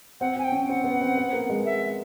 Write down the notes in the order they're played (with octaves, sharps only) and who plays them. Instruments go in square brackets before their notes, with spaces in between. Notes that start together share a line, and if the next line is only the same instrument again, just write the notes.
[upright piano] C4 [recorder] F#5
[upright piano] C4 [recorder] G#5
[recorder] G5
[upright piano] C#4
[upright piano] C4 [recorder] F#5
[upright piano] B3
C4
B3
A#3
G#3
[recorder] E5